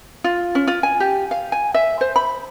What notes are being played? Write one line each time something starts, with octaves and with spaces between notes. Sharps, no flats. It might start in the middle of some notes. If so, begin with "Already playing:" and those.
F4
C#4
F4
G#5
G4
F5
G#5
E5
C5
B5